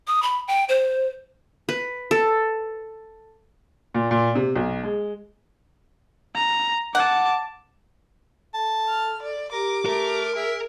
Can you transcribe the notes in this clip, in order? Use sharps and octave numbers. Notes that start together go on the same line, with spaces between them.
D#6
B5
G5
C5
B4
A4
A#2
A#2
C3
B1
G#3
A#5
F#5 A5 D6
A4 A5
F6
D5
G4 A#4 D6
A3 A#4
G#4 E5